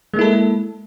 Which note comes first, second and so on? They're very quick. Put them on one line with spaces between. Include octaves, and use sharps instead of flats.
G#3 A#3 E4 A4